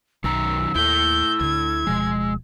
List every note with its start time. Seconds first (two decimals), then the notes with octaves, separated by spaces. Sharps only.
0.24 B1 F#2 D#3 A#5 E6
0.75 D#2 E4 A4 G6
1.41 D2 D3 G#6
1.87 D1 B2 F3 G#3